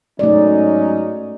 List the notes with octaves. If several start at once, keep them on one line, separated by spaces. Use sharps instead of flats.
G#2 F#3 A3 C#4 D#4 D5